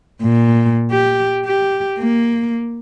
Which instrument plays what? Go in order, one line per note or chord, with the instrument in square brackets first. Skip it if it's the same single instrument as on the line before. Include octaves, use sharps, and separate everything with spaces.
[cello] A#2
G4
G4
A#3